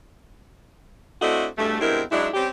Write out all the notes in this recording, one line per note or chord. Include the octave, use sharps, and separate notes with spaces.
A3 C4 D4 E4 F#4 D#5
E2 G2 B2 A3
G2 B2 G#3 C4 E4 A#4
G#2 F#3 G#3 D4 E4
G3 C4 C#4 G4